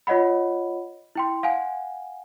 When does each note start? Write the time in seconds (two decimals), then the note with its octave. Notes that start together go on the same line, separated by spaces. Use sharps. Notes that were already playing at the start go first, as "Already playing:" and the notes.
0.07 F4 C#5 D#5 F#5 B5
1.15 E4 G5 C6
1.43 F5 F#5 G#5